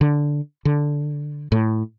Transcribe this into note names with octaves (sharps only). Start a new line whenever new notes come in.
D3
D3
A2